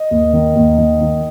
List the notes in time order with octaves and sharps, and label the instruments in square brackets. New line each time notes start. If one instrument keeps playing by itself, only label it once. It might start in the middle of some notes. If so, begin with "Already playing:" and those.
Already playing: [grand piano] D#5
D#2
D#3
D#2
D#3
D#3